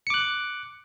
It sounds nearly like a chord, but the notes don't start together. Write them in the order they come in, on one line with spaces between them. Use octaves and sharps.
C#7 D6 F#6